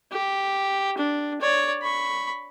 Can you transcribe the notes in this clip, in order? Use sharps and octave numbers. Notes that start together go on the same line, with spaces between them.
G4
D4
C#5 D5
B5 C#6